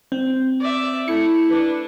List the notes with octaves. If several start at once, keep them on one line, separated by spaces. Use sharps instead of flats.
C4
D5 E5
A3 E4 C#7
D4 B4